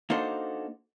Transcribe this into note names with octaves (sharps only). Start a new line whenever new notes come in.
A#3 D4 D#4 F#4 A4 C5